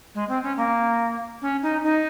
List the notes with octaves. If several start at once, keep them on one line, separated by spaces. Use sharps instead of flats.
G#3
C4
C#4
A#3
C#4
D#4
D#4